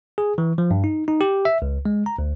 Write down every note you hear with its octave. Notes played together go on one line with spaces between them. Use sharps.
G#4
E3
F3
G2
D#4
D#4
G4
E5
C#2
G#3
A#5
D2